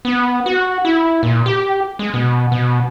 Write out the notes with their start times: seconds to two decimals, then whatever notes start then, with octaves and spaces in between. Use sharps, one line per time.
0.05 B3
0.46 F#4
0.85 E4
1.23 A#2
1.46 G4
1.99 G#3
2.14 B2
2.52 B2